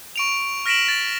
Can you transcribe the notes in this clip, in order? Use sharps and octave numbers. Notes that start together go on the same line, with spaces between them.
C#6 D7 F7
F6 A#6 B6 D7 E7 F#7
A6